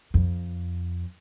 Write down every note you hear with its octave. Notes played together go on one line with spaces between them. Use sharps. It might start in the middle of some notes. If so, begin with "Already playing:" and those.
F2